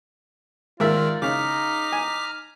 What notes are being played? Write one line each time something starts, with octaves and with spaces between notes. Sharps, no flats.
G#2 D#3 F4 A#4 D5 E5
C#3 D#4 A#5 D6 F6 B6
G#5